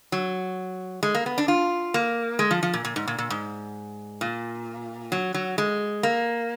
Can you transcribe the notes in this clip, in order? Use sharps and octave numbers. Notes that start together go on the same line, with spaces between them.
F#3
G#3
A#3
B3
D4
F4
A#3
G#3
F3
F3
A#2
A#2
G#2
A#2
A#2
G#2
A#2
F#3
F#3
G#3
A#3